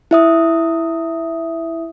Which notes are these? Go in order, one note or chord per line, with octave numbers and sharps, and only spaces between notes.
E4 E5 D#6